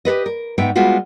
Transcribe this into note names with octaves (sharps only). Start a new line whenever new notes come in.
G4 A4 B4 D#5
A#4
G#2 B3 E5 G5
G3 G#3 B3 F4 F#4